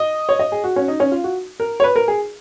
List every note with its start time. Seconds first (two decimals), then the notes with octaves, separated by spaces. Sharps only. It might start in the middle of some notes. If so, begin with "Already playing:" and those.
Already playing: D#5
0.29 C#5
0.39 D#5
0.52 G#4
0.64 F#4
0.76 C#4
0.88 D#4
1.00 C#4
1.12 F4
1.24 F#4
1.60 A#4
1.80 C#5
1.84 B4
1.96 A#4
2.08 G#4